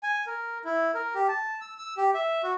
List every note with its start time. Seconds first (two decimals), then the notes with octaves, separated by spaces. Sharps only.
0.03 G#5
0.27 A#4
0.65 E4
0.95 A#4
1.15 G4
1.28 A5
1.61 E6
1.78 E6
1.97 G4
2.14 E5
2.43 F#4